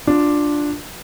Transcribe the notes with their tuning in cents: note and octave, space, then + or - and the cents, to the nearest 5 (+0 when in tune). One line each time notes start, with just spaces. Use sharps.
D4 +0 F4 +10